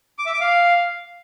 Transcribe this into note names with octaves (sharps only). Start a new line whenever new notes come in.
D6
E5
D6
F5